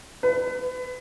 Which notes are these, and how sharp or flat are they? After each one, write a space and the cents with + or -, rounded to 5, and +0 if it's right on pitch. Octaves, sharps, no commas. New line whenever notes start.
B4 +35